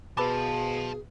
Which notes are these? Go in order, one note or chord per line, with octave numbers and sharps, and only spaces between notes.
B2 G#4 B4 F5 A5 B5 D6